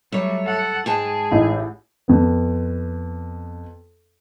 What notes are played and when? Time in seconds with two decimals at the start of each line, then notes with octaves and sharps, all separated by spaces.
0.12 F#3 G3 A3 C#5
0.45 A4 F#5
0.86 G#2 G#4 G5 A5
1.31 A1 A2 D#4
2.08 F2 B3